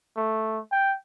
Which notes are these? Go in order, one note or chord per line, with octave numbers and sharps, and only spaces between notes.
A3
G5